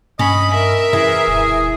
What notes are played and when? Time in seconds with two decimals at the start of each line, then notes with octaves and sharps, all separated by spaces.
0.19 G2 C#4 D#5 B5
0.54 A#4 E5
0.93 F#2 E3 G#4
1.28 D#1